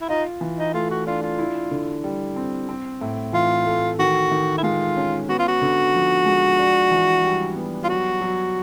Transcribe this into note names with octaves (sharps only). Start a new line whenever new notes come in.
E4
D#4 F4
E3
D#4
A3 F4
F#4
D4 F4
F4
E4
D3
G3
C4
C4
A2
E3 F4
A3
D#3 F#4
D#3
E4
G#3 F4
C#4
B3 F#4
F4
F#4
D3
F3
G#3
D4
E3
G3
B3
F4
F#3 F#4
F#3